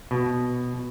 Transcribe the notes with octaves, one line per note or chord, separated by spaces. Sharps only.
B2